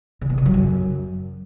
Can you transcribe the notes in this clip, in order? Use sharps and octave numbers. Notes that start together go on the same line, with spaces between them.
C#3
B2
C#3
F#3
F#2